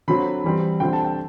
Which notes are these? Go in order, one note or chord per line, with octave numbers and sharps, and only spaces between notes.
D3 F#3 C4 B5
E3 G3 C4
D3 G3 C4 G5
A5
G5